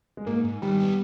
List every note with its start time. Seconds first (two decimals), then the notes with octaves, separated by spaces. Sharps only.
0.17 G#3
0.26 G#2 A#3
0.45 G#2
0.62 D#3 G3
0.80 B3